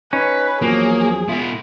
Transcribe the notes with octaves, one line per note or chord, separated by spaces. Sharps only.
C#4 D#4 B4
E2 F3 F#3 A#3 G#4
B2 E4 F4